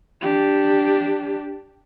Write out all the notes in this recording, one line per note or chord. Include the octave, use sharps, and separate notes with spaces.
D4 G4